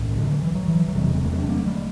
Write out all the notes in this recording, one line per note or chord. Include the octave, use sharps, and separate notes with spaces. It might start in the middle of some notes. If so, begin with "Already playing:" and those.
Already playing: B1 A2
E3
D3 F#3
E3
F#3
E3
F#3
E1 E2 C3 E3 G3
B3
F#3 A3
D4
A3 C4
F#3 A3